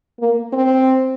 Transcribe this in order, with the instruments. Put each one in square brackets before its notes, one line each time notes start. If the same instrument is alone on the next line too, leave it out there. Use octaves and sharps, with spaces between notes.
[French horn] A#3
C4